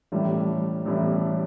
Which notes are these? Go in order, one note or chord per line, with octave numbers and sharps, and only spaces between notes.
A1 A2 G3
A1 A2 G3